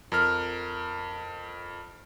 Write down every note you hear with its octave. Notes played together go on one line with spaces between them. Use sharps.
F2 A#4 F6